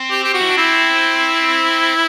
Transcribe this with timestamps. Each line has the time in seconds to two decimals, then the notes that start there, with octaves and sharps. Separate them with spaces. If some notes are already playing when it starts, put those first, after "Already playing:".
Already playing: C4
0.10 G4
0.24 G4
0.34 F#4
0.41 E4
0.49 D4
0.57 C4 E4